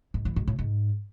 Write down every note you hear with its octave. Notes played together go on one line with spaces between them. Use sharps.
G#2
E3
G#2
A2
G#2